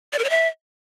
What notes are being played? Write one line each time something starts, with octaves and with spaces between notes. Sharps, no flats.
D5
A#4
C#5
E5